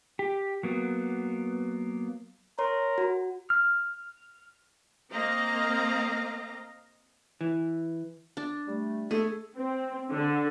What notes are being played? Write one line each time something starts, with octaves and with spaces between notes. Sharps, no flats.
G4
F#3 A#3 B3
A#4 C#5 C6
F#4
F6
A#3 C4 D#5 F5 A#5
E3
D4
G3 A3
A3 G#4 A4
C4
D3